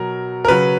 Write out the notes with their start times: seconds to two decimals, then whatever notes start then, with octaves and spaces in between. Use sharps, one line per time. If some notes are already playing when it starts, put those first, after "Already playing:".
Already playing: B2 F#3 A#4
0.45 A#4
0.48 C#3 F#3 B4